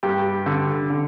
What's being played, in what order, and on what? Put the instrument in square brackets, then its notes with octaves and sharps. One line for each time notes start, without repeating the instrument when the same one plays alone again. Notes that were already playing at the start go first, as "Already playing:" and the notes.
[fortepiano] G2 G4
D3
D3